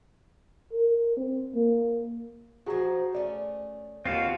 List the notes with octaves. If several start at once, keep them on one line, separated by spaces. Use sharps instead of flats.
A#4
C4
A#3
F3 D4 F#4 G#4 A#5
A3 C#4 D5
D#2 B3 C4 F4 F#4 F5